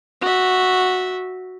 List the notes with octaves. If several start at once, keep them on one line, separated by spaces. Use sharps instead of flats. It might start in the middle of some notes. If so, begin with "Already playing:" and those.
F#4 E5